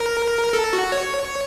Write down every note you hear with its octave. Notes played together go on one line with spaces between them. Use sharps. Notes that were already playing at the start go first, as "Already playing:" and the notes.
Already playing: A#4
A4
F#4
C#5